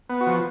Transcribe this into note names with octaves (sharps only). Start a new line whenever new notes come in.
B3
F#4
F3